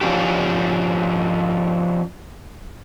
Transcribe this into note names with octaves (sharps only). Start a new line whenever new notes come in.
F3 C#4 D4 G4